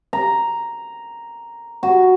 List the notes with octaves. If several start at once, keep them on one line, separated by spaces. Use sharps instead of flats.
A#5
F#4